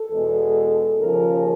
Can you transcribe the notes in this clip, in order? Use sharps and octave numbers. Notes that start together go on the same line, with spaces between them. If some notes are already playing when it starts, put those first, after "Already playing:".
Already playing: A4
E2 B2 G#3
D#2 C#3 F3 A#4